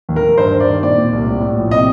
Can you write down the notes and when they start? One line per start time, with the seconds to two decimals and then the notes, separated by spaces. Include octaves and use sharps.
0.09 D#2
0.16 A#4
0.23 D#2
0.38 G2 C5
0.53 G2
0.60 D5
0.67 D#3
0.82 A#2 D5
0.97 A#2
1.13 C2
1.27 A2
1.41 A2
1.56 A#1
1.71 C3 D#5